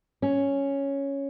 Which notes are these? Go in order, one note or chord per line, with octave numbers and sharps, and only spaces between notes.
C#4